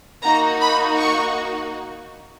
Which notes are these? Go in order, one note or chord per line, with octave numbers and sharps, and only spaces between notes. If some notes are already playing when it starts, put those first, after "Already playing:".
A#3 D#4 F#4 A#5
B5
C#6